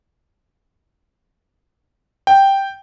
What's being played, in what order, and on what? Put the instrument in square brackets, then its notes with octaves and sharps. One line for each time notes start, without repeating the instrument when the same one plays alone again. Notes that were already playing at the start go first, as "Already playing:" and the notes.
[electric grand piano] G5